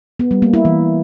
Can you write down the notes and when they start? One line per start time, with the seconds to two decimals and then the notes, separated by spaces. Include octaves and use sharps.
0.20 B3
0.31 G3
0.42 A#3
0.54 E4
0.65 E3